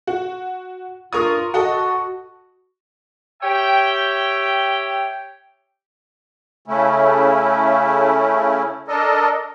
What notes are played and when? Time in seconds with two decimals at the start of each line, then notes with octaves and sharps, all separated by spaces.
0.07 F#4
1.13 G2 F4 A#4 C#6 D#6
1.54 F#4 A4 D#5 F#5
3.43 G4 C#5 E5 G5
6.66 C#3 A3 C#4 E4
8.88 D4 A4 A#4 D#5